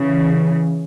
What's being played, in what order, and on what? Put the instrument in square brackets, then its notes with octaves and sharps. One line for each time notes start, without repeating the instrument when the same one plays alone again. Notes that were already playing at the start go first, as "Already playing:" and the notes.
Already playing: [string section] C#3 E3